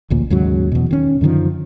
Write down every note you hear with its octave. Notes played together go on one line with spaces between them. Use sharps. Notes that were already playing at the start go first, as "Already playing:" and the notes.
A1 D2 A#2
D#2 G#2 C#3 F#3
E2 B2
D#3 C#4
F#2 D3 D#3 F3